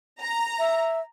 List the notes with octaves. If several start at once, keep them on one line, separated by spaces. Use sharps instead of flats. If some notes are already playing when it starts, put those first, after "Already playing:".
A#5
E5